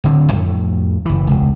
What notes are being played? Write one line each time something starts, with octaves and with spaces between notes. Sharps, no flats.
D1 D3 C4
F2 A2 A3
F#1 E3
E1 C#2